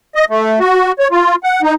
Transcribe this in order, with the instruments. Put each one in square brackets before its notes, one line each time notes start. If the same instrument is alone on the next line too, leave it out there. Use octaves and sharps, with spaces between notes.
[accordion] D#5
A3
F#4
C#5
F4
F#5
D#4